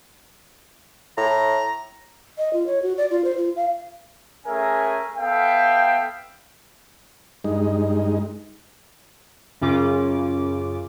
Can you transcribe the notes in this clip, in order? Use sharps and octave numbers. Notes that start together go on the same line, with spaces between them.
A2 A#5
D#5
F4
C#5
F#4
D5
F4
C5
F4
F5
A3 C#4 G#4 A#4 E5 G#5
B3 A4 E5 F5 G5
G2 G#3 D#4
F#2 C#3 C#4 F4 D6